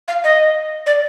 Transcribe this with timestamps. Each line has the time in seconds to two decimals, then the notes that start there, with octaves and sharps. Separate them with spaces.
0.08 F5
0.24 D#5
0.86 D5